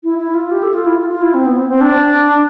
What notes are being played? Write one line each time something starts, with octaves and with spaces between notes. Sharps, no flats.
E4
E4
F4
G4
A4
F4
E4
F4
F4
E4
C4
B3
C4
C4
D4